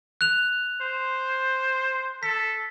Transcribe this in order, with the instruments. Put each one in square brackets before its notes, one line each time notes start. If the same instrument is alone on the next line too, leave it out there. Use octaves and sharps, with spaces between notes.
[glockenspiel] F#6 F7
[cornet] C5
[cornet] A4 [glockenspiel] B6